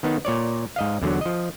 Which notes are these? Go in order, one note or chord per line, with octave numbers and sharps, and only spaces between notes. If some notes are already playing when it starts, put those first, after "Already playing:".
D#3 B3 D#4
A#2 C#5 D5
G#2 D#5 F5
E2 D3 F#3
F3 D#5